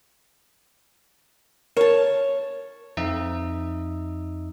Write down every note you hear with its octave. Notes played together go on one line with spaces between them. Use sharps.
A#4 C#5 A5
F2 D#4 D#5 E5